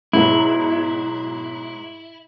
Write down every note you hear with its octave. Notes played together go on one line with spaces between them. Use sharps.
G#2 B2 F#3 E4